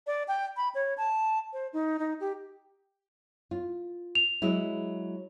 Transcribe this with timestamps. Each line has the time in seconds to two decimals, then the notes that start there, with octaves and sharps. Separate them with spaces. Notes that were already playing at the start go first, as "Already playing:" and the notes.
0.07 D5
0.28 G5
0.57 B5
0.75 C#5
0.97 A5
1.53 C5
1.73 D#4
1.99 D#4
2.20 G4
3.51 F4
4.15 F7
4.42 F#3 G#3 E4